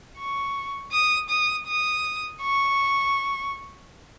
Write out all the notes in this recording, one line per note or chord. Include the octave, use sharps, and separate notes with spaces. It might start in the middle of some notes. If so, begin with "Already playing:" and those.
C#6
D#6
D#6
D#6
C#6